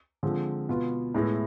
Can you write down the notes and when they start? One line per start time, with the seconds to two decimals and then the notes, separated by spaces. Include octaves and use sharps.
0.23 D3 F3 G#3 C4
0.69 B2 B3 F4
1.14 A2 G#3 B3 E4